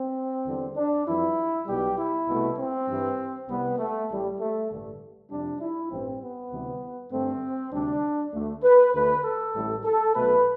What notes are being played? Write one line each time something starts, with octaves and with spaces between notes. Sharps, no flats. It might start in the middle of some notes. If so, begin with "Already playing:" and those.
Already playing: C4
E2 D3 G3
D4
F2 E3 G3 E4
B1 B2 G3 G4
E4
C2 B2 A3
C4
G2 E3 G3
C2 C3 G3 B3
A3
A1 A2 G3
A3
A1 G2 D3 A3
F2 C3 G3 D4
E4
A1 G2 E3 C4
B3
D2 C3 E3 G3
G2 D3 A3 C4
D2 C3 G3 D4
D2 D3 A3
B4
D2 D3 A3 B4
A4
A1 A2 G3
A4
B1 B2 A3 B4